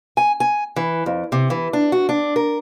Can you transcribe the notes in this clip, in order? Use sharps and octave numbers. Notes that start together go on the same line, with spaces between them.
G#5
G#5
E3
F2
C3
E3
D4
F#4
D4
A#4